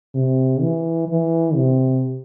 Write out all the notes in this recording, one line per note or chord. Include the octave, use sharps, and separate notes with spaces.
C3
E3
E3
C3